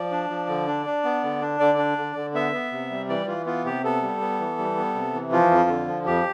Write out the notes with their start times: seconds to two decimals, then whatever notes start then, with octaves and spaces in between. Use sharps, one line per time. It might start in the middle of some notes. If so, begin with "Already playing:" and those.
Already playing: F3 D5
0.11 D4
0.30 F3
0.49 D3
0.67 D4
0.86 D4
1.04 B3
1.24 D3
1.41 D4
1.60 D3 D5
1.78 D4
1.98 D3
2.16 D3
2.34 B3 E5
2.53 B3
2.72 C3
2.91 G3
3.09 E3 D5
3.27 E3 F4
3.46 B3 F4
3.65 C3 G4
3.84 B3 A4
4.02 G3
4.21 B3
4.39 E3
4.58 G3
4.77 B3
4.95 C3
5.14 E3
5.32 F3 F4
5.51 F2
5.69 D3
5.87 F3
6.06 F2 G4